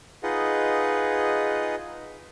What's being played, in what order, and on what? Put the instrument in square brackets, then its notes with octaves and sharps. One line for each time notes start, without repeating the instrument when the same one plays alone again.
[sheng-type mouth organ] D#4 F4 G#4 B4 D#5 F#5